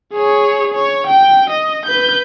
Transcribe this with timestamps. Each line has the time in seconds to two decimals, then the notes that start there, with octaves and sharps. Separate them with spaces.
0.13 G#4 C#5
0.74 C#5
1.08 G5
1.50 D#5
1.86 B4 G6